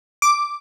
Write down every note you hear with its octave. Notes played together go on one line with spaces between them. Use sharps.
D6